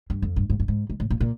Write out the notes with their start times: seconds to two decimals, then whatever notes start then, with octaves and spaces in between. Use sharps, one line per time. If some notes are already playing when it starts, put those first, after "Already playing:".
0.10 G2
0.22 F2
0.36 G2
0.50 G#2
0.60 G2
0.68 G#2
0.90 G#2
1.00 A2
1.10 A#2
1.20 A#2